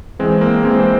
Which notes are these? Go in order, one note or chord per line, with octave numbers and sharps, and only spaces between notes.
E2 E3 G#3 C4
A#3
E2 E3 G#3 C4
C5